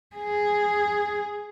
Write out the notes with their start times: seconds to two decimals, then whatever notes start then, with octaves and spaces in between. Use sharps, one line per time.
0.17 G#4